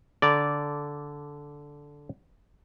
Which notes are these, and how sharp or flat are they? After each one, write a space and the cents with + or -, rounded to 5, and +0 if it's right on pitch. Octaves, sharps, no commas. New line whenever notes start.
D3 -10 D5 -10 A#5 +0